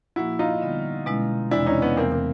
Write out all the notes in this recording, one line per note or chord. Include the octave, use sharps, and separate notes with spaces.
A#2 F3 A#3 E4 F#4
D#4 F4
D3 G3 B3
B2 G#3 C#4 E4
E2 C3 E3 G#3 C4 D4 E4
C#4 D#4
B3 C#4
E2 C3 E3 A3 A#3 C4
A#3